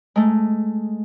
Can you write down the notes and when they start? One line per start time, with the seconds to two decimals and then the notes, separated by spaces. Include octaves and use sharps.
0.16 G#3 A3